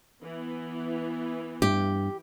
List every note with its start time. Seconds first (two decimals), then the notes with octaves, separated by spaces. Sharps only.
0.22 E3 B3
1.62 G2 G4